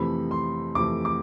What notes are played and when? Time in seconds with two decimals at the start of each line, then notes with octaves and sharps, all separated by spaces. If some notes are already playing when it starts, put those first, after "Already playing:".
Already playing: F2 C3 E3 A3 B5
0.31 C6
0.75 F2 C3 E3 A3 D6
1.05 D6